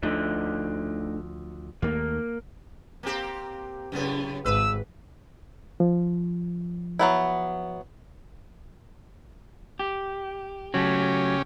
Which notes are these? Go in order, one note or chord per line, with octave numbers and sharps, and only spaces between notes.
D2 F3 A3 D4 D#4
D#2 D#3 A3 A#3
A#3 C4 G4
F#2 A2 C#3 B3
G#1 B4 E6
F3
F#3 B3 E4
G4
C#3 F#3 A3 C#4 G4